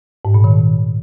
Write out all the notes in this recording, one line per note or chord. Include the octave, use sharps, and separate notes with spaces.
G#2
A#2
D#3